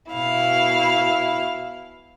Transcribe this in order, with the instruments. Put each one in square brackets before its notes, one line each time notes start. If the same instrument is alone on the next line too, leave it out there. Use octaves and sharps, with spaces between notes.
[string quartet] B2 E4 F5